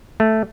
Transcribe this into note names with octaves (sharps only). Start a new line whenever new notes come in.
A3